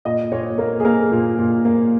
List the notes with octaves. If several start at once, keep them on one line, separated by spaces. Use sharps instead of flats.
A#2 D#5
A#2 C#5
A#3 A#4
G#4
A#3 A#4
A#2
A#2
A#3